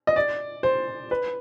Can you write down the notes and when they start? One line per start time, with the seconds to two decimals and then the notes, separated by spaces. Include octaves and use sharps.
0.07 D#5
0.16 D5
0.63 C5
1.11 B4